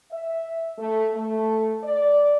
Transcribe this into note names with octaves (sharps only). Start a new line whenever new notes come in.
E5
A3
A3
D5